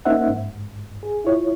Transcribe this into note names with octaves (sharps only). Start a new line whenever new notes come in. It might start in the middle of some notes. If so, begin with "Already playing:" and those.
A#3 C#4 D#4 C5 E5 F#5
G#2
G#4
E4 F4 C#5